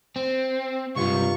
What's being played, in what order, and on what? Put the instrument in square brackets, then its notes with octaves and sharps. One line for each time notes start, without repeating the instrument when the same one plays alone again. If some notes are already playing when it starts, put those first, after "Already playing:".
[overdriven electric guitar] C4
[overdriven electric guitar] C#2 C3 [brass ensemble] G2 [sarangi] F4 [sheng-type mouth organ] C#6